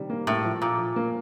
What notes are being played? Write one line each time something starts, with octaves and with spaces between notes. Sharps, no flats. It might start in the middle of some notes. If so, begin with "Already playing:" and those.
Already playing: C3 D#3 G3
A#3
A2 A#3
F3
A#2 F4
F3
A#3